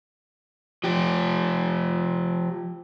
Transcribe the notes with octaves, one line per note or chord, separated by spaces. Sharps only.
F3 G4